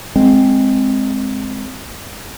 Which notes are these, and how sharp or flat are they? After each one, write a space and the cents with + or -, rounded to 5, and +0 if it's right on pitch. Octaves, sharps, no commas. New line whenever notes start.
G#3 +0 C4 +0